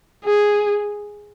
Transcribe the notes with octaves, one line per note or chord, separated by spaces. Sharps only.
G#4